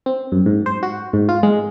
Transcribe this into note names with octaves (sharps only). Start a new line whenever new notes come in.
C4
F#2
G#2
C5
F#4
G#2
F4
G#3